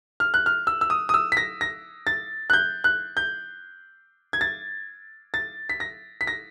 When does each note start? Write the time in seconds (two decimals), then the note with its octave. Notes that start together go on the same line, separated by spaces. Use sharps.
0.20 F6
0.34 F#6
0.46 F6
0.67 E6
0.81 E6
0.90 D#6
1.09 D#6
1.14 E6
1.32 B6
1.37 A#6
1.61 A#6
2.07 A6
2.50 F#6
2.53 G6
2.84 F#6
3.17 G6
4.33 G#6
4.41 A6
5.34 A6
5.69 B6
5.80 A#6
6.21 B6
6.27 A#6